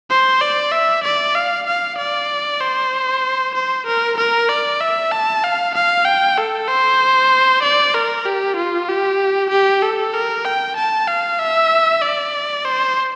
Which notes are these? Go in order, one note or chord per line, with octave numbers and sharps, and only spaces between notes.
C5
D5
E5
D5
F5
F5
D5
C5
C5
A#4
A#4
D5
E5
A5
F5
F5
G5
A4
C5
D5
A#4
G4
F4
G4
G4
A4
A#4
G5
A5
F5
E5
D5
C5